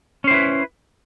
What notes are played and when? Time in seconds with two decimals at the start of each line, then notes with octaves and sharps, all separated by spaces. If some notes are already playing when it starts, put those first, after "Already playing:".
0.24 C#4
0.27 C5
0.31 E4
0.34 B4